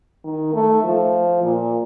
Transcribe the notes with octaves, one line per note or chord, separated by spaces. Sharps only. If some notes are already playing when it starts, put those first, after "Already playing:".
D#3
A3
F3
A#2